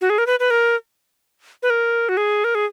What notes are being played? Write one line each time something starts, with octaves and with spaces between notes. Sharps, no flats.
F#4
G#4
A#4
B4
B4
A#4
B4
A#4
F#4
G#4
A#4
G#4